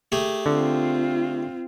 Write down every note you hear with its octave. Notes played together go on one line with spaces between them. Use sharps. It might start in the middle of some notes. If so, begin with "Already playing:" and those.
A3 G4 G#4
D3 C4 F4